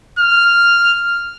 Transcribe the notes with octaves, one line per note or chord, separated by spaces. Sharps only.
F6